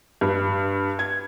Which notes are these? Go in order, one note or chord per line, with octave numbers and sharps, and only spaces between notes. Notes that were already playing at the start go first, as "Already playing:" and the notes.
G2
G#6